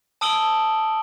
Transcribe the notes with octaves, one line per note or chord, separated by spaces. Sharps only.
A5 D#6 E6 D7 F#7 G7